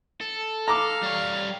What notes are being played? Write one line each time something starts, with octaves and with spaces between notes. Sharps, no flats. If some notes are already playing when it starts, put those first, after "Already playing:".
A4
F5 A#5 D6
G3 C#5